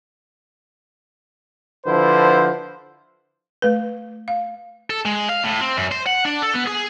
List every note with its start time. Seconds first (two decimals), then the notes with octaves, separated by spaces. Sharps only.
1.86 D3 F3 E4 B4 C5
3.62 A3 B4
4.28 F5
4.90 A4
5.05 G#3
5.29 F5
5.43 A2
5.61 C4
5.77 F#2
5.91 C5
6.06 F#5
6.25 D4
6.42 A4
6.54 B3
6.66 G#4